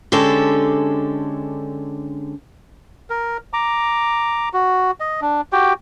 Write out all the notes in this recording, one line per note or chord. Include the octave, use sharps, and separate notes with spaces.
D3 G#3 C#4 G4 A4
A#4
A#5 D6
F#4
D#5
D4
F#4 G4 G5